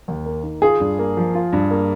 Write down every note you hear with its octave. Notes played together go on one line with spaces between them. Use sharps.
D#2
A#3
D#3
F4 G#4
G2
A#3
F3
F4
G2
A#3